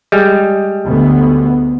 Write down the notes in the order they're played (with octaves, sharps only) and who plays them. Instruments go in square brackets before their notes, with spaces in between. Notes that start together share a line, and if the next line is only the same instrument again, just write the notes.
[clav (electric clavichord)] G3 G#3
[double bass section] D2 B3